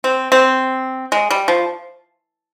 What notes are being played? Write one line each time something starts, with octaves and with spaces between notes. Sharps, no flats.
C4
C4
G#3
G3
F3